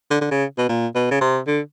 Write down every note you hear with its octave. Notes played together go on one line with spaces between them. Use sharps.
D3
D3
C#3
B2
A#2
B2
C#3
C3
D3